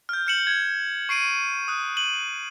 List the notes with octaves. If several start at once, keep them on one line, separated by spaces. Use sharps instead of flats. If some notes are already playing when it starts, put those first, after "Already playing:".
F6 G6
F6 G6 C#7 E7 F#7
G#6
C#6 C7 D7 D#7
D#6 F#6
D#7 F#7